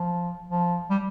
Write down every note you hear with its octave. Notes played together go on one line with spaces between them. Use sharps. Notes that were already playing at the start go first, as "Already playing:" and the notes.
Already playing: F3
F3
G3